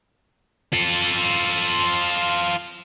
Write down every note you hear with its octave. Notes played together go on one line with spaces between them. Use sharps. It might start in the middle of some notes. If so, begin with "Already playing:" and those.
F4 A4